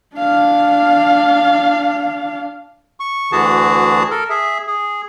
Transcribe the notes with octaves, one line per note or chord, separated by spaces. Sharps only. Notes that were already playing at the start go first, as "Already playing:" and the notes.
D4 F5
C#6
D2 D3 E3 F#4 G#4 A5
A4 A#4
G#4 E5
G#4